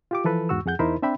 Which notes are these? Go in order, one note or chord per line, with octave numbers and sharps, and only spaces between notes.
F4 G4 D6
E3 F3 A4 B4
E2 G#2 F#4 C#6 E6
F2 G#4 F#5 G6
E2 D#4 E4 A#4 C5 B5
C4 D4 E5 G5 B5